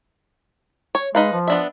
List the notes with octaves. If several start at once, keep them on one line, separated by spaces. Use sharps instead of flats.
C#5
G#3 D#4 B4 F5
F3
B3 D4 E5